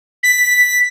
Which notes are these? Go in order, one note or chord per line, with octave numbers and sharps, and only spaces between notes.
B6